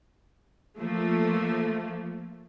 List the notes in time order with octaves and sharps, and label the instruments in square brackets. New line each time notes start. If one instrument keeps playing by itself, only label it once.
[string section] F3 A3 A#3